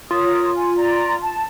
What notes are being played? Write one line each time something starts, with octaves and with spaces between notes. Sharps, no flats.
F4 A#4 C#5 D#6
G#5
D5 A#5
A5